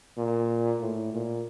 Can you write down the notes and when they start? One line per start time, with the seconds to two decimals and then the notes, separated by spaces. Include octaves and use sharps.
0.18 A#2
0.81 A2
1.13 A#2